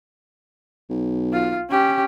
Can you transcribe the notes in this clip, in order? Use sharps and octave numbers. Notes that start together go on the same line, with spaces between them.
B1
F4
C#4 G4